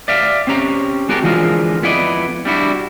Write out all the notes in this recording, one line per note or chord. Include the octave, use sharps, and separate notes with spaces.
D5 E5 F5
C4 C#4 G4 A#5
G#3 F#4 G4 A4 A#4
D3 E3 F3 G#3 F4 A#4
F2 B3 E4 D5 D#5
G3 D4 E4 F#4